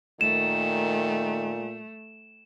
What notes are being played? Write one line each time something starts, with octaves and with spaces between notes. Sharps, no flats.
A#2 D#3 A3 E7